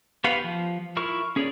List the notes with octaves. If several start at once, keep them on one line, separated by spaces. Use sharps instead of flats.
B3 G4 B4 F5 F#5
F3
E4 F4 A#4 C#6 F6
C#4 G#4 A#4 C#5 D5